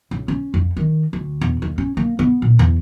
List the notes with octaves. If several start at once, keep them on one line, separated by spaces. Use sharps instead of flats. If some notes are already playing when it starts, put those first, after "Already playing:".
C#2
C#4
F2
D#3
D2
E2
D#2
C#4
A#3
B3
A#2
E2